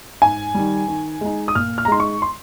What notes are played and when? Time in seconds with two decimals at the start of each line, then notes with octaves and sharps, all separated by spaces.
0.22 G#2 G#5
0.54 D#3 G3
0.88 D#3
1.21 G#3 D#4
1.48 D#6
1.55 A#2 F6
1.78 F6
1.85 A#5
1.88 G#3 D#4 C6
2.00 C#6
2.22 C6